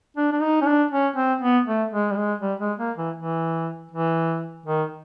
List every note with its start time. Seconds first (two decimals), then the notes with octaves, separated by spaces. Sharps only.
0.17 D4
0.33 D4
0.41 D#4
0.62 C#4
0.67 D4
0.91 C#4
1.16 C4
1.42 B3
1.66 A3
1.91 G#3
2.11 G3
2.16 G#3
2.42 G3
2.60 G#3
2.79 A#3
2.98 E3
3.16 E3
3.92 E3
4.66 D#3